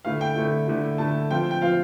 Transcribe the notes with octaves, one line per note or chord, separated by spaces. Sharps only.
D3 A3 E4 F5
G5
D3 A3 E4
D3 A3 E4
D3 A3 E4 A5
F3 C4 F4 G5
G5
F3 C4 F4 F5